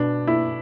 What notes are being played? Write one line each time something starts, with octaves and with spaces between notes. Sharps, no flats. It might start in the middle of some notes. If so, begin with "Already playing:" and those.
Already playing: B2 D4
E4